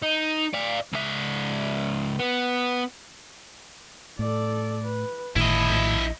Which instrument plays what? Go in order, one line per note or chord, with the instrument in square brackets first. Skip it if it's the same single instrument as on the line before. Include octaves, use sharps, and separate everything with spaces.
[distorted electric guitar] D#4
D5 F5
C#2 E5
B3
[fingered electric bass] A2 [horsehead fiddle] A4 D5
[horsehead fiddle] B4
[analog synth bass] G1 [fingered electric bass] A2 D#3 [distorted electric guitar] E4 D#5 [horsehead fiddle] A5 B5
[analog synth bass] A#1